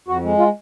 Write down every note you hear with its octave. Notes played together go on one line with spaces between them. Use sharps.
F2 F#4
G#3
F4